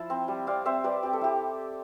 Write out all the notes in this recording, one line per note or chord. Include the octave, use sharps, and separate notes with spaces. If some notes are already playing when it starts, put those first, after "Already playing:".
Already playing: F3 E4 A5
C4
G3
C4 D5 F5
C4 C5 E5
G3 B4 D5
C4 G4
A4
E4 G4